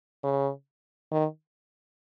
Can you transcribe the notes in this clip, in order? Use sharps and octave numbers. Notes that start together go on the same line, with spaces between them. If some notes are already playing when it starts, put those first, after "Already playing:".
C#3
D#3